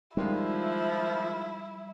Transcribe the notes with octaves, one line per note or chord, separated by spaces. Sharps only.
D#3 F3 G3 G#3 E4 F4